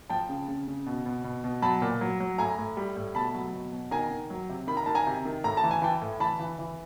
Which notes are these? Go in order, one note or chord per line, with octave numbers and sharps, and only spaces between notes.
F3 G5 A5
C#3
C#3
C#3
B2
B2
B2
B2
F#3 A5 B5
A#2
F#3
F#3
A2 G#5 A#5
A2
G3
A2
B2 A5 B5
F#3
B2
B2
D#3 G#5 A#5
D#3
F#3
C3
D#3 B5
A#5
D#3 A5
G#5 A#5
C3
D#3
A2 A#5
A5
E3
G#5
E3 G5 A5
A2
E3 A5 B5
E3
E3